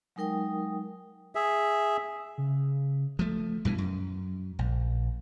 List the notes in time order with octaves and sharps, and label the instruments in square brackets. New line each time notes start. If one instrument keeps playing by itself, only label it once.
[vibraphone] F#3 G#3 D#4 A#4 G5 D#6
[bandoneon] G#4 E5
[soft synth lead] C#3
[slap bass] F3 A3
G2 B2 E3
F#2
A#1